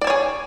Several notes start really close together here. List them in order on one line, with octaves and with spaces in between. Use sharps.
D5 A5 C#5 G#4